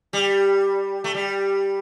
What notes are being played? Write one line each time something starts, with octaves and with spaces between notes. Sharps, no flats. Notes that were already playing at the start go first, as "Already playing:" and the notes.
G3
A3
G3